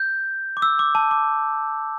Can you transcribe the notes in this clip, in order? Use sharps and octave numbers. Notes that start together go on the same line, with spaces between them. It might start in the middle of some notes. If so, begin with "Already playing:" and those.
Already playing: G6
D6
E6
D6
A5
D6